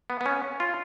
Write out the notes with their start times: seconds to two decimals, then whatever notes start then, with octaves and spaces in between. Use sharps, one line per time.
0.10 B3
0.21 B3
0.26 C#4
0.60 F4